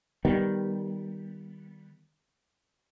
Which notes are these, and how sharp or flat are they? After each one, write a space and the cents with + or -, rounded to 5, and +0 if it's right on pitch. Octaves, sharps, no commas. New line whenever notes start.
D#3 +0 G3 +0 B3 -5